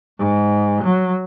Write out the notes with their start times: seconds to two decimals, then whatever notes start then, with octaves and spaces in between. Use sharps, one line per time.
0.18 G#2
0.83 F#3